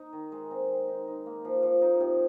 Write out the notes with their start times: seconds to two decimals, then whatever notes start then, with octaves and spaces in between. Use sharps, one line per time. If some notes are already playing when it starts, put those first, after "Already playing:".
Already playing: D#4
0.13 D#3
0.32 G#3
0.51 C4
0.70 C4
0.88 D#4
1.08 D#4
1.26 A#3
1.45 F3
1.63 F3
1.81 D#4
2.00 C3